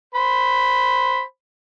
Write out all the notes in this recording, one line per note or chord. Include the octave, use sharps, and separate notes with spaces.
C5 B5